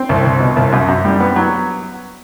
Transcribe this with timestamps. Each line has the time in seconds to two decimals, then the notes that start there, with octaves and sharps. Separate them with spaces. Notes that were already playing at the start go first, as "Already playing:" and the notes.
Already playing: C4
0.09 C2
0.25 C2
0.40 B2
0.56 C2
0.72 F#2
0.88 F#2
1.05 G3
1.20 B3
1.36 F#3